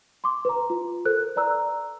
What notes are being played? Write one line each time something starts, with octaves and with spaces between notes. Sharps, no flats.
C6 D6
B4 A#5
F4
A4 A#4 C5 F#6
B4 D5 A#5 E6 F#6